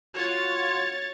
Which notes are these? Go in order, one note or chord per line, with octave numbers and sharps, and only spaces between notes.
F4 F#4 C#5 A6